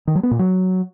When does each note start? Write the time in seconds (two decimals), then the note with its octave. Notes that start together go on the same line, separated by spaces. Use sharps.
0.07 D#3
0.15 F#3
0.23 B3
0.31 A#2
0.39 F#3